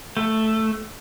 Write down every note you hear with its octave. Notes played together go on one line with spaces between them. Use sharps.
A3